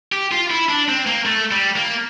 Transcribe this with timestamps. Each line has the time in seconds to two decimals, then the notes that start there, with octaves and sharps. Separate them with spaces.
0.12 G4
0.32 F4
0.50 E4
0.69 D4
0.89 C4
1.07 A#3
1.26 A3
1.51 G3
1.76 A#3